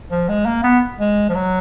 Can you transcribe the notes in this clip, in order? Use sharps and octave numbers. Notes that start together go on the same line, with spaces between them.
F3
G#3
A#3
B3
G#3
F3
F#3